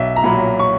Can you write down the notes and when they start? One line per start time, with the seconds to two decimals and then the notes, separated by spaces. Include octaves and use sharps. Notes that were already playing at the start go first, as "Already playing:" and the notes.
Already playing: B1 E5
0.16 A#5
0.24 A#2 F#3 B5
0.59 C#6